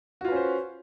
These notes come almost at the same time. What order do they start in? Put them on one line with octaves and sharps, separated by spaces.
F#4 F4 B4 C#4 C5